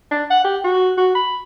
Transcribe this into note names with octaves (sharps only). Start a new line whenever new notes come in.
D4
F#5
G4
F#4
F#4
B5